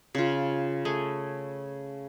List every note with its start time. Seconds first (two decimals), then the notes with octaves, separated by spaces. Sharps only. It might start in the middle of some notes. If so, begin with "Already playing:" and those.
0.15 C#3 F4
0.85 A3 G#4